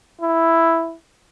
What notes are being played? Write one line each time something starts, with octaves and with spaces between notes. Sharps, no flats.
E4